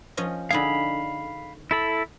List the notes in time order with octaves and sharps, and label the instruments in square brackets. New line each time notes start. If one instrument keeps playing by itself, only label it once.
[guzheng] F3 C#4 D#5
[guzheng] D3 D#4 G#4 [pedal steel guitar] F5 B5
[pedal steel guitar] E4 A4 B5